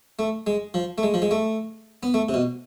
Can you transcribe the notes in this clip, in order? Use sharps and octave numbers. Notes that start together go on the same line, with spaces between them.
A3
G#3
F3
A3
G#3
F3
G#3
A3
B3
A3
C3
B2